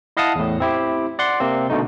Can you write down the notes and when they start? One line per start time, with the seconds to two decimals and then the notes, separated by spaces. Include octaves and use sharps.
0.17 E4 D#5 F5 F#5 A5 D#6
0.35 E2 A2
0.60 C4 E4 G4
1.19 D5 F#5 C6
1.40 C3 A#3 C4
1.70 B2 D3 A3 D#4